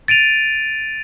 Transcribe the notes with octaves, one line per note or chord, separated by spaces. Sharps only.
A6 D7 D#7 F7